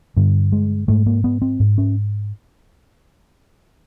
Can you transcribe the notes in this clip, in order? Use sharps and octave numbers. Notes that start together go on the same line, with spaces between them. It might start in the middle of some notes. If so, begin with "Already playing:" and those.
G2 D3
G#3
G#2 A3
A#3
B3
C4
G#2
C#4